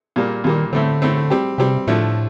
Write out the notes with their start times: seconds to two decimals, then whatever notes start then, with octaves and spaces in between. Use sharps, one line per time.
0.16 A#2 G3 A#3
0.44 A#2 D#3 G3 A#3
0.72 A2 D3 A3 C4
1.02 A2 A3 C4
1.30 G3 C4 G4
1.58 C3 G3 C4 G4
1.87 A2 D3 F3 A3